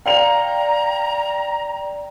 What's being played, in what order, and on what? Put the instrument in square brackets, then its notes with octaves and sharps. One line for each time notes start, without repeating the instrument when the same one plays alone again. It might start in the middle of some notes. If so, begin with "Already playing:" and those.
[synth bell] D5 G5 [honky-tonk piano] F5 F7 [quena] A#5